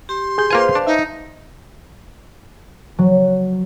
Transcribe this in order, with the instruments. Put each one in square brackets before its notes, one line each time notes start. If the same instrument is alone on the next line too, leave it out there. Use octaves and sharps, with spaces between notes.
[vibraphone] G4 [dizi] C6
[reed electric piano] G#4 G6
[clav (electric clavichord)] A#3 F4 G#5 [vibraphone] B4 C5 F5
[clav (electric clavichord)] D4
[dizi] D#4 [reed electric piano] E5
[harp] F#3